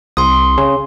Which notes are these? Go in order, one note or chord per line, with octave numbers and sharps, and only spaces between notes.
C2 C6 D#6
C#3